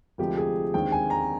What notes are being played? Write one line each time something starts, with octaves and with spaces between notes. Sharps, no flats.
D2 C3 F3 G#3 G4
G#4
D#2 D3 G#3 C4 G5
G#5
A#5